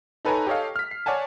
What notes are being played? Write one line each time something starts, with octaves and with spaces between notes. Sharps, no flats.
D#4 A4 B4 C#5 G#5 A#5
G4 A4 C#5 D#5 F5
F6 B6
C7
C#5 D5 F#5 G#5 A5